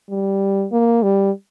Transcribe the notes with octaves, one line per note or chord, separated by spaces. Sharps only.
G3
A#3
G3